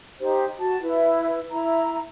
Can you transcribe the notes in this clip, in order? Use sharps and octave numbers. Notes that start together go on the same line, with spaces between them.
D#4 G4 C5
F#4 A5
E4 B4
E4 A#5